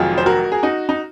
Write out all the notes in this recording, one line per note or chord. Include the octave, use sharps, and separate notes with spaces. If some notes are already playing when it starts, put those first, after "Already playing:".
Already playing: F1 F2 D#3 F#3 F4 G#4
C5
F#4 A#4
G#4
D#4 F#4
D#4